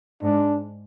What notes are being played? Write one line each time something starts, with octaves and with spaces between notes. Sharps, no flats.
G#2 D4